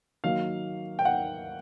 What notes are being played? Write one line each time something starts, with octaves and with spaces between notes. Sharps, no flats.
D#3 F#3 A#3 F5
G5
F#5